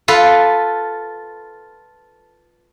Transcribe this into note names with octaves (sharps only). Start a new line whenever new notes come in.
F4 A4 B4 F5